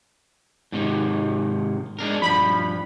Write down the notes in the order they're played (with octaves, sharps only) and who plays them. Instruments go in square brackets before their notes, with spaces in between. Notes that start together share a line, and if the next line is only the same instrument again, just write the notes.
[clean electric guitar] G#2 C3 D#3
G#3 D4 A#4
[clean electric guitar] G2 F3 [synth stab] B5